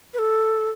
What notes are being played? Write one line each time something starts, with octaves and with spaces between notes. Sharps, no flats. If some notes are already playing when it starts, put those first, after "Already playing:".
B4
A4